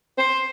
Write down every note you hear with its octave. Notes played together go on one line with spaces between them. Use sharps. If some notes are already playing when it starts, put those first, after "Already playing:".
C5